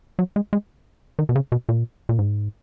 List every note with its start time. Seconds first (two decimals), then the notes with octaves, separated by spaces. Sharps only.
0.19 F#3
0.36 G#3
0.53 G#3
1.19 D#3
1.29 B2
1.35 C#3
1.52 B2
1.69 A#2
2.09 A#2
2.19 G#2